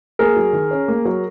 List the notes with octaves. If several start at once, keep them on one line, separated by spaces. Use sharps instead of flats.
A#3 G#4 A#4
F#3
D#3
C#4
A#3
F#3